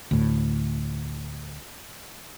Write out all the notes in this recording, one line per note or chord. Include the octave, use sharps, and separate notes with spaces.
D2 A2